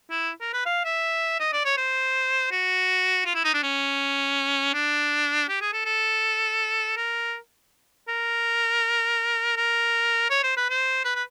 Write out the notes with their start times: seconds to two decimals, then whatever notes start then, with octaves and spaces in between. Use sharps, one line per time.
0.10 E4
0.41 A#4
0.53 B4
0.66 F5
0.85 E5
1.40 D#5
1.53 D5
1.65 C#5
1.77 C5
2.51 F#4
3.26 F4
3.35 E4
3.44 D#4
3.54 D4
3.63 C#4
4.74 D4
5.48 G4
5.61 G#4
5.73 A4
5.85 A4
6.97 A#4
8.08 A#4
9.56 A#4
10.30 C#5
10.43 C5
10.57 B4
10.70 C5
11.05 B4
11.15 B4